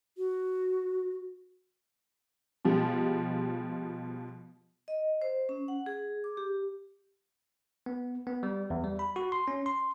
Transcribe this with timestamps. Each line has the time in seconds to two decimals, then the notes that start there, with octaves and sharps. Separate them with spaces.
0.18 F#4
2.65 B2 F3 G3 G#3
4.88 D#5
5.22 C5
5.49 C#4
5.68 F#5
5.86 G#4
6.24 D6
6.37 G4
7.86 B3
8.27 B3
8.43 G3
8.70 E2
8.84 G3
8.99 B5
9.16 F#4
9.32 C6
9.48 C#4
9.66 C6